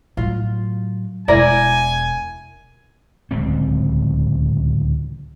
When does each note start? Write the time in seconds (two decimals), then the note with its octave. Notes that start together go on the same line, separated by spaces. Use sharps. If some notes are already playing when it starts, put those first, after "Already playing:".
0.17 A2 F#3 F4
1.28 E1 E4 A#4 D5 G#5
3.31 D1 C#2 C4